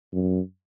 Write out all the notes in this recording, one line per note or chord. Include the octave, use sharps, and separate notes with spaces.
F#2